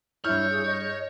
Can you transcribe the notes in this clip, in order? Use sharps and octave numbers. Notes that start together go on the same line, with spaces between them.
G2 E4 C#5 F6 G6
G#4
D#5